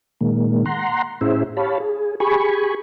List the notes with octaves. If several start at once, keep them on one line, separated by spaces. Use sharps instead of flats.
A#2 D#3 G#3 A#3
F#5 A#5 C6
A2 C#4 E4 G#4 C5 E5
G4 C#5 F5 A5 B5
G#4
G4 G#4 G#5 B5 C#6